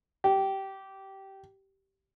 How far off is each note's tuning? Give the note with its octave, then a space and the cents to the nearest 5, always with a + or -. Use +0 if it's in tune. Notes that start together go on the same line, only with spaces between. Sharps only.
G4 -15